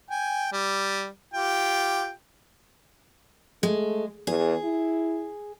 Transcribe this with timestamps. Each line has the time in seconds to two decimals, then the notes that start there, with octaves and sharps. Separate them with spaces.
0.10 G5 G#5
0.52 G3
1.34 F4 G4 G5
3.63 G#3 A3
4.27 E2 G#4
4.64 E4